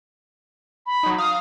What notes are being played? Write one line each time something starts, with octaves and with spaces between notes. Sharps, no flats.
B5
F#3 D#4
F5 D#6